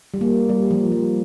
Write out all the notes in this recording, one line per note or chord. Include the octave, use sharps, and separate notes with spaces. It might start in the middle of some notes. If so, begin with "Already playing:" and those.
G3
A#3
G3
F3
G3